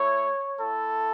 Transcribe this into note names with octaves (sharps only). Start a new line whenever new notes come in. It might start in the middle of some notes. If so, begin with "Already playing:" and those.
Already playing: A3 E4 C#5
A3 E4 A4